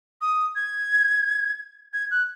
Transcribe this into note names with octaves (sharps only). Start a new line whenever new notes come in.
D#6
G#6
G#6
F#6